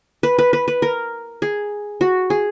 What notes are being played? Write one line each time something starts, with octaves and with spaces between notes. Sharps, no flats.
B4
B4
B4
B4
A#4
G#4
F#4
G#4